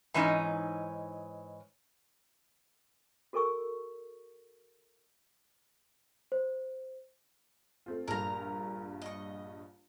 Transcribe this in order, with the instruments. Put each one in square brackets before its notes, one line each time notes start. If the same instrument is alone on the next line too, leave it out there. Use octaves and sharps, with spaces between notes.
[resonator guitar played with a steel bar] G#2 E3 C#4 D#4
[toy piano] F#4 A4 A#4 G#5 C#6 E6
[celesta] C5
[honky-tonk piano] A3 C4 F4
[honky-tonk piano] A#1 G2 [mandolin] A#4 A#5
[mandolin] D#5 C#6